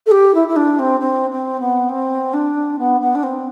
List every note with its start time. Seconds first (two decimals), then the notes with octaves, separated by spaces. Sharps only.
0.06 A4
0.11 G4
0.34 E4
0.47 E4
0.56 D4
0.79 C4
1.00 C4
1.30 C4
1.60 B3
1.89 C4
2.33 D4
2.78 B3
3.00 B3
3.15 D4
3.23 C4